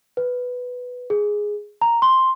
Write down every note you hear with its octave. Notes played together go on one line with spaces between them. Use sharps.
B4
G#4
A#5
C6